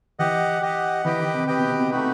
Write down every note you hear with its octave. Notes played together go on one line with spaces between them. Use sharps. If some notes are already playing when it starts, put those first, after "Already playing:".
E3 G4 D#5 F#5
G4 D#5 F#5
E3 G4 B4 D#5 G5
D#3
C3
C3 G4 B4 D#5 G5
B2
C3
B2
C3 A3 D#4 F#4 B4